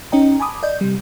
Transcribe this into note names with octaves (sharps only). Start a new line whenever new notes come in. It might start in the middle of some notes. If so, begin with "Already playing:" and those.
C#4 D#4 D#5 G5 A#5
G#5 A5 B5 D6 D#6
D5 D#5 G6
C3 G3